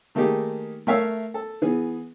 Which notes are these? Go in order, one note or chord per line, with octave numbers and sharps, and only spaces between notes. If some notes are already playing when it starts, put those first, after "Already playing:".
D#3 A3 A#3 D#4 G4 G#4
A3 A#4 C#5 E5 F5
A4
E3 B3 G#4